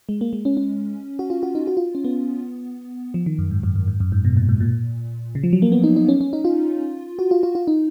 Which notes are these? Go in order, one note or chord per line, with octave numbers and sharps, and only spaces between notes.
G#3
A#3
G#3
C#4
C#4
F#4
F4
F#4
D#4
F#4
F4
C#4
B3
F3
D#3
F#2
G#2
F#2
F#2
G#2
F#2
G#2
B2
A#2
G#2
A#2
C#3
F3
F#3
A#3
B3
D#4
D#4
C#4
C#4
D#4
F4
F#4
F4
F4
F4
D#4